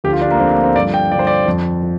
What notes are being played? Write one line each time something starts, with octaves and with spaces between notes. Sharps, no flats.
D2 D3 F3 G4
F4
D4
A#3
D2 D3 F3 C4
A#3
C4
G2 D3 F3 D5
G5
G2 D3 F3 D5
C5
D5
F2 F3
F3